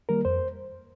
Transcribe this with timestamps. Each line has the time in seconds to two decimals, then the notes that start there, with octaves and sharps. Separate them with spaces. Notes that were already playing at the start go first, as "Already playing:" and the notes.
0.09 D#3 G3 A#3 A#4
0.25 F2 C5